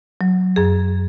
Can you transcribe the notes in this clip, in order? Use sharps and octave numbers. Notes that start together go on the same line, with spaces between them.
F#3
F#2 G#4